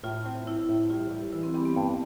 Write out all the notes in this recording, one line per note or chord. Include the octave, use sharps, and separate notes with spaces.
A2 F4
C4
C4 E4
A2
G3 F4
G3
E3 E4
C4
G3 C4
B3
G2 A#3